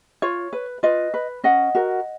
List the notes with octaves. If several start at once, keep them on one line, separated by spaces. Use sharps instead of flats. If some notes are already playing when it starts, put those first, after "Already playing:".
F4 C#5
B4
F4 B4 D#5
B4
C#4 D#5 F#5
F#4 A#4